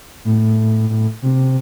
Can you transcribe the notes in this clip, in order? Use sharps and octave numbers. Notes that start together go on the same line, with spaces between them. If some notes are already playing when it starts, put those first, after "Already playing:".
A2
A2
C3